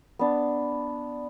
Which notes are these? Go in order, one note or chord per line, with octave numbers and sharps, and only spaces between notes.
B3 D4